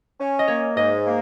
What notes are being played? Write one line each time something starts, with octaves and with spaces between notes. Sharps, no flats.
C#4
D#5
A#3 C#5
G#2 D#5
A#3